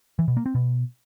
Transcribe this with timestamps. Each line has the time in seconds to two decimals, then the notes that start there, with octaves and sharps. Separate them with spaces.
0.19 E3
0.28 B2
0.37 A#3
0.46 C4
0.55 B2